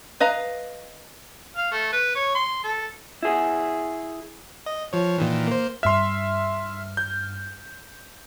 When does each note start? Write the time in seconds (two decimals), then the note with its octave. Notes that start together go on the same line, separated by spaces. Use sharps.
0.20 B4 D#5 F5 A#5
1.56 F5
1.71 A3
1.92 B4
2.15 C#5
2.35 C6
2.64 A4
3.23 E4 G#4
4.66 D#5
4.93 F3 C#5
5.18 A#2 D#3 E3
5.47 A#3 C5
5.83 G2 E5 C6 F6
6.97 G6